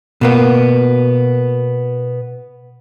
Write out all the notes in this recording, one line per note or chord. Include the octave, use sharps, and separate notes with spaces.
B2 A#3 B3